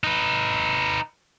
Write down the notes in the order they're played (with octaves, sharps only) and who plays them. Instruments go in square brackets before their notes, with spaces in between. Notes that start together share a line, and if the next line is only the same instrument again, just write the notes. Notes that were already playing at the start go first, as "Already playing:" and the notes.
[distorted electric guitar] D#4 B4